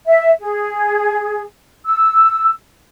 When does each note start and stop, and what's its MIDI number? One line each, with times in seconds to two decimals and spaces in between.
0.06 0.29 76
0.40 1.42 68
1.85 2.48 88